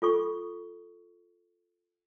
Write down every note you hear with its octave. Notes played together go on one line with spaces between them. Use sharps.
F4 A4 C#6